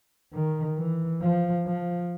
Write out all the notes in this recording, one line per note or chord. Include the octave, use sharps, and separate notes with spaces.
D#3
E3
F3
F3